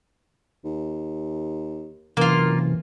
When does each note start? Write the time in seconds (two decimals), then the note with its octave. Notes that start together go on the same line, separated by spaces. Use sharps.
0.65 D#2
2.17 F#1 C3 E3 A#3 F4